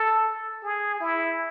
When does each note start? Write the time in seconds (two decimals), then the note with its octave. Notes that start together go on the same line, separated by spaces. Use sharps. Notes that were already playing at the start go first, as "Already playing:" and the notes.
Already playing: A4
0.63 G#4
1.00 E4